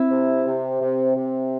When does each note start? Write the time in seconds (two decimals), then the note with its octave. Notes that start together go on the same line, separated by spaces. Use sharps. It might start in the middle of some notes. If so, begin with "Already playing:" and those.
Already playing: C4 E4
0.10 C3
0.46 C3
0.82 C3
1.16 C3